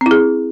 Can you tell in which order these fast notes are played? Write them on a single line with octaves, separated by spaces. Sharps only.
C4 E4 G#4